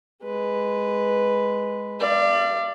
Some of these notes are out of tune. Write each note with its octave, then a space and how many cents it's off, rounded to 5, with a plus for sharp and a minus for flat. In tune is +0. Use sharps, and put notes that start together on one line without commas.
G#3 +0 B4 +0
D5 +15 F5 -35